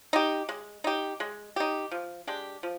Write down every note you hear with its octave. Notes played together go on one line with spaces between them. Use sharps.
D#4 G4
G#3
D#4 G4
G#3
D#4 G4
F3
G#3 D4 G4
F3